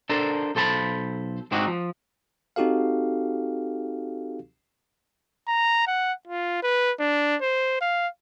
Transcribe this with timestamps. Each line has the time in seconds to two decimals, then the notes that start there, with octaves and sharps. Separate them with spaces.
0.09 D4 A4 A#4 C5
0.55 B1 A4 C5 A5 B5
1.52 G#2 C4 D4 D#4 F#4
1.67 F3
2.56 C4 D#4 F#4 G4 A4 F5
5.47 A#5
5.87 F#5
6.27 F4
6.63 B4
7.00 D4
7.41 C5
7.81 F5